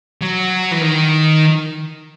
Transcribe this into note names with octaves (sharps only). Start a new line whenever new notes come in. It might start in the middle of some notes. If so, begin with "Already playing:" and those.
F#3
E3
D#3